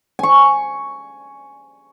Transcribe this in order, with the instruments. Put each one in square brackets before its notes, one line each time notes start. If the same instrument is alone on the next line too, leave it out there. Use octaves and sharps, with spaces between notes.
[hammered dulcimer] G#5 C#6